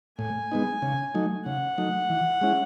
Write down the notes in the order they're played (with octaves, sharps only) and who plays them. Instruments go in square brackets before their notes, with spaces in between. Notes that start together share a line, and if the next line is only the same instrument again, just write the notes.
[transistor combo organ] A2 [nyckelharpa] G#5
[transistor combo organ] G#3 B3 D#4
C#3
F#3 A3 D#4
[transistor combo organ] C#3 [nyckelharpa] F#5
[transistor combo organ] F#3 A3 D#4
E3
G#3 C#4 E4